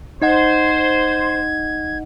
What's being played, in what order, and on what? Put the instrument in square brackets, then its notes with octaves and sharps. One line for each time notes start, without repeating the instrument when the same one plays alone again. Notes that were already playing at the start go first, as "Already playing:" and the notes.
[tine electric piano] D#4 D#5 F#5 [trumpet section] C5 [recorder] G#6